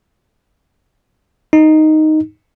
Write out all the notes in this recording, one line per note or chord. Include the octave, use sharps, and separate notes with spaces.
D#4